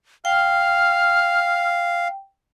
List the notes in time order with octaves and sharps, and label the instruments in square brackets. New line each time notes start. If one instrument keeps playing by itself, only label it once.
[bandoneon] F5 [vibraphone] G5 [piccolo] F6